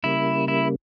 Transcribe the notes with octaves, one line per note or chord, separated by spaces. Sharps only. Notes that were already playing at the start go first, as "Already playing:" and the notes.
C#3 G3 A#3 E4
E4